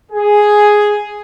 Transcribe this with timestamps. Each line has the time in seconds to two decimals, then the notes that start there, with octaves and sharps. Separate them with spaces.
0.10 G#4